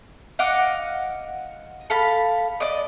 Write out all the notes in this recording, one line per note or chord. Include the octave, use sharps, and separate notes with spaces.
D#5 F5 F#5 D6
A4 F5 B5
D5 D#5